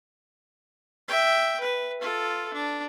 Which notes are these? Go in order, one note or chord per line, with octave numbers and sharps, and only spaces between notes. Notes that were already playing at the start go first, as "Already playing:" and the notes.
E5 G5
B4
F4 A4
D4